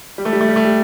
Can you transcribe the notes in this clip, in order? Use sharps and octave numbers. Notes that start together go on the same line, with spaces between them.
G3
A3
G3
A3
G3
A3
G3